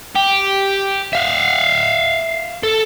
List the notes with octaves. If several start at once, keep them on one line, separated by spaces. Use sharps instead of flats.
G4
E5 F5
A4